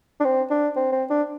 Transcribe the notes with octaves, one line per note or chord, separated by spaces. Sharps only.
D4
C4
D4
C4
C4
D4